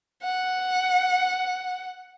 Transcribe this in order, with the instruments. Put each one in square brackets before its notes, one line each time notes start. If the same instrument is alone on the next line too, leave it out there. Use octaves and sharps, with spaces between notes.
[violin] F#5